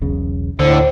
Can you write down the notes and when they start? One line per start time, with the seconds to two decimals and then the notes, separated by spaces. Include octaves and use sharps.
0.01 E1 B1 C#3
0.59 D2 A2 D3 C5